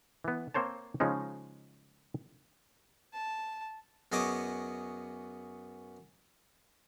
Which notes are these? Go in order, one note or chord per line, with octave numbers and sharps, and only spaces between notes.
E3 B3
A#3 C4 C5 C#5 A5
C#3 F3 G#3 C#4 D#4
A5
F#2 B3 G#4 D#5 C#6 D6